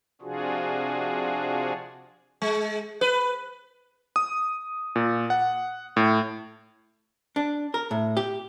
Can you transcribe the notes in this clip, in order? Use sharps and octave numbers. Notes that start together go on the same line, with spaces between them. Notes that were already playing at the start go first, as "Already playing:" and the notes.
C3 F3 D4 F4 F#4 G#4
G#3
B4
D#6
A#2
F#5
A2
D4
A#4
A2
G4